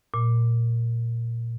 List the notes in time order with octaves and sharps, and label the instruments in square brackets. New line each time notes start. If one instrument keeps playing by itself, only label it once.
[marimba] A#2